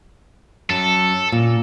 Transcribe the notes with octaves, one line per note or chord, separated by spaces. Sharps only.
F#2 A4
A#2